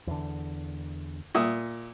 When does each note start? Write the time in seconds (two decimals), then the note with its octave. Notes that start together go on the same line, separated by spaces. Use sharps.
0.07 E2 D3
1.35 A#2 E5 D#6